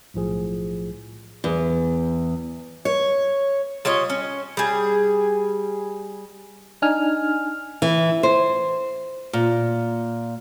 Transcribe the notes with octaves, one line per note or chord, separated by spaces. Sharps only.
B1 A2 F3 G#4
E2
C#5
G3 F4 C#5 D#5
C#4
G3 G#4
D4 D#4 G#5 F6
E3
C5
A#2